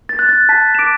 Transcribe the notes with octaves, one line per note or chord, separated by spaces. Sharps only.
A6
F#6
A6
A5 B6
E7
D6 D7